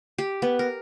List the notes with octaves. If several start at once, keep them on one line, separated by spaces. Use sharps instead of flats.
G4
B3
A#4